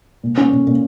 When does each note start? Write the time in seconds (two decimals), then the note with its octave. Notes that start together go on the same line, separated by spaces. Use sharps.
0.23 A#2
0.37 C#4
0.52 A#2
0.67 A#2